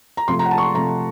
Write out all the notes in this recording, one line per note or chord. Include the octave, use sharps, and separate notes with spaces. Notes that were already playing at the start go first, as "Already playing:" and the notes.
A#5
C3 F3 A3 C6
A#5
F#5
A5
C#6
C6
C3 F3 A3 A#5